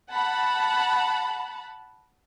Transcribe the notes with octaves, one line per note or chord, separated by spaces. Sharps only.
F#5 A5 B5